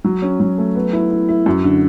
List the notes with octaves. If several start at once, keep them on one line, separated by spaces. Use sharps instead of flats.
F#3
C#4
F#3
A3
B3
E4
E4
E4
F#2
D3